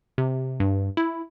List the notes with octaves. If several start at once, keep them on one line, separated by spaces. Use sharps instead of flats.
C3
G2
E4